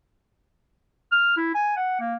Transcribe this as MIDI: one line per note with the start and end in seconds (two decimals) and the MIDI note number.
1.12 1.33 89
1.37 1.53 64
1.55 1.73 80
1.77 1.99 78
2.00 2.15 58